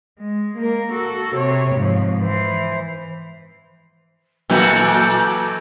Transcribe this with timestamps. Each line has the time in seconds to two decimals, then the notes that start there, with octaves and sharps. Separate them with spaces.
0.19 G#3
0.57 A#3 A#4
0.93 F#4 A4
1.36 C3 C#5
1.75 G#2 F3
2.21 E3 C5
4.50 A#2 E3 F#3 A#3 F#4 A4 D6 G6